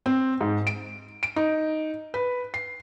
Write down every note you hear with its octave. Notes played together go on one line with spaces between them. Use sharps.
C4
G#2
D7
D7
D#4
B4
C7